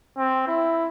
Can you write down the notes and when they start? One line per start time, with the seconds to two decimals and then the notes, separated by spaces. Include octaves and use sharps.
0.18 C4
0.47 E4